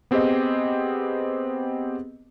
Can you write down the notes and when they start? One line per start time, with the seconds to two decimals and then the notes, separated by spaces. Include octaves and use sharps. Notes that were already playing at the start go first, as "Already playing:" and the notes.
0.11 B3 C4 G4 G#4 C5 D#5